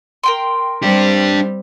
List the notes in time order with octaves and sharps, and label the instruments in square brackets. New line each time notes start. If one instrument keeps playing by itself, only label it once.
[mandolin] A#4 G5 C6
[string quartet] G3 C4 [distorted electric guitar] D4 G4